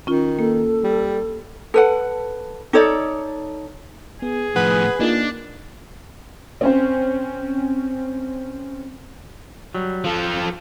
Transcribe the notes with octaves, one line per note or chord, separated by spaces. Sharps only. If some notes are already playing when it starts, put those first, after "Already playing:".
D#3 C#4 F4
A#3 A4
G3
A4 B4 F#5
D#4 A4 C#5 D5
B3 G#4
A2 F3 B4 F#5 G#5 D#6
A#3 D4 D#4 F4
C4 C#4 C5
F#3 G3
F3 F4 A4